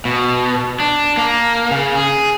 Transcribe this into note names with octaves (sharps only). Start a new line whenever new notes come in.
B2
D4
A#3
C#3
G#4